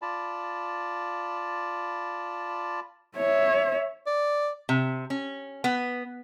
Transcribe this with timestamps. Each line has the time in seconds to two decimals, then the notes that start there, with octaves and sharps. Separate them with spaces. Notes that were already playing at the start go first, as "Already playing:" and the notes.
0.02 F4 D5 A5 B5
3.16 C#5 E5
4.07 D5
4.69 C3
5.10 C#4
5.64 B3